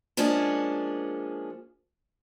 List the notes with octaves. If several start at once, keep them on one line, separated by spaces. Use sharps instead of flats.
F3 G#3 A#3 C#4 D4 G#4